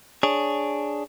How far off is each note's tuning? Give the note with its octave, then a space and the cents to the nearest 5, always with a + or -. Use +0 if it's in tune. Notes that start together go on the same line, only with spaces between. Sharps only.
D4 +0 G#4 +0 C#5 +0